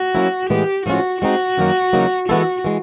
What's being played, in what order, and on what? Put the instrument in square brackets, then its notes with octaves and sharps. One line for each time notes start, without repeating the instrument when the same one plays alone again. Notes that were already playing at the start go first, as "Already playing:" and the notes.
Already playing: [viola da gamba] F#4
[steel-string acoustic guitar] F#3 A#3 C#4 E4
[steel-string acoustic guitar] A2 E3 G#3 B3 [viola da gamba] G4
[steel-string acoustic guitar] A2 F3 G#3 C#4 F4 [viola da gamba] F#4
[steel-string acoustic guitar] G#3 C4 D#4 [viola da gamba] F#4
[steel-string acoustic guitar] F#2 D#3 F#3 A#3
E2 C#3 F#3 A#3 D#4
[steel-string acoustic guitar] E3 G#3 B3 E4 A4 [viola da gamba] F#4
[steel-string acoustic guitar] E3 G#3